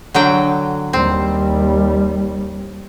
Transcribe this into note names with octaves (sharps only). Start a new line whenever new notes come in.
D3 F#3 G5
D#2 G3 C4